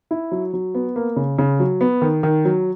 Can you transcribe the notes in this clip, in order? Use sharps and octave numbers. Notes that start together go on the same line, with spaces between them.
E4
F#3
F#3
B3
A#3
C#3
C#3
F#3
B3
D#3
D#3
F#3